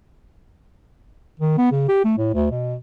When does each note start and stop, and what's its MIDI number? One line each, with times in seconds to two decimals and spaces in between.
1.40 1.55 51
1.58 1.72 59
1.72 1.84 49
1.89 2.02 67
2.05 2.14 57
2.18 2.31 45
2.34 2.46 38
2.51 2.76 47